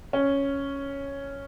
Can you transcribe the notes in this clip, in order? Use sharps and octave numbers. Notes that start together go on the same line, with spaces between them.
C#4